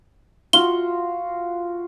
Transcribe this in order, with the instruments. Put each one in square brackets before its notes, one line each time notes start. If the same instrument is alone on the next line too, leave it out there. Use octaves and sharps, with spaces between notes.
[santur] F4 F#4 [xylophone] G7